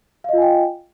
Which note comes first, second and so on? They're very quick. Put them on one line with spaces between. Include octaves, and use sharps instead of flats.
F5 D#5 F4 G#5 G5